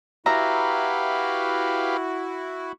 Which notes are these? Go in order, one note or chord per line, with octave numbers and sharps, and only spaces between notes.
E4 F#4 G4 B4 E5 F5 A#5